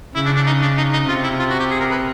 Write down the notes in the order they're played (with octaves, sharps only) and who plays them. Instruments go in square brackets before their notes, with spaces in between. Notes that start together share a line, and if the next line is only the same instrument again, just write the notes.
[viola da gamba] C#3 [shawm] E4
[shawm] D4
D4
D#4
D4
D#4
D#4
[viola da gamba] C3 [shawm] F4
[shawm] E4
F4
F#4
G4
G#4
A#4
B4